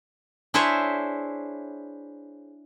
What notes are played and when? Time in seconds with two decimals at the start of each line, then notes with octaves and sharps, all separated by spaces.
0.54 D4 E4 G#4 C5 C#5 E5